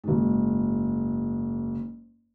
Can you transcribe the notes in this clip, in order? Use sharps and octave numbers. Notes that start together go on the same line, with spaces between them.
F#1 G#2